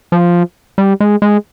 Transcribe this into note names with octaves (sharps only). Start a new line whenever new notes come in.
F3
G3
G#3
G#3